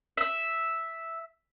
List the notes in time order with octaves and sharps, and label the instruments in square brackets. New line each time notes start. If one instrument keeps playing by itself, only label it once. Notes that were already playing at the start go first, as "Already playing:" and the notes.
[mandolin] E5